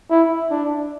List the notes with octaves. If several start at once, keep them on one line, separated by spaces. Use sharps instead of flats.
E4
D4